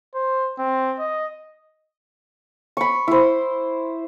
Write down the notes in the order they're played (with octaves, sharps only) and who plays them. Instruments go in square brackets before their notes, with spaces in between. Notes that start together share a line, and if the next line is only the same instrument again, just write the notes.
[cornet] C5
C4
D#5
[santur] B5 C#6
E4 C5